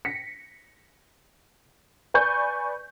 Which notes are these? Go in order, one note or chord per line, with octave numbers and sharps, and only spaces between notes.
A#6 B6 C#7
B4 D5 G#5 C#6 G6